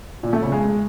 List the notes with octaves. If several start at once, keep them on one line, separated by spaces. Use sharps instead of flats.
A#2
A3
C#3
G#3